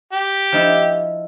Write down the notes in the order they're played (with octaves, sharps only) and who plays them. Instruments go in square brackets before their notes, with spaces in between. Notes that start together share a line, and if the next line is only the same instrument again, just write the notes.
[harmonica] G4
[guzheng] F3 D#4 E4